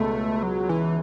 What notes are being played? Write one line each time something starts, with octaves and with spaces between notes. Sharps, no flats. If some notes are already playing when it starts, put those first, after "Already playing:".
Already playing: C#2 B2 G#3 A3
F#3
E3